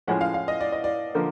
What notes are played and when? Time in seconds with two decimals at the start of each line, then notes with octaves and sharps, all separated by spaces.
0.07 A2 F3 G#3 C#4 F#5
0.21 F5
0.34 F5
0.48 D#5
0.61 D5
0.72 D#5
0.84 D5
1.15 D3 F3 A#3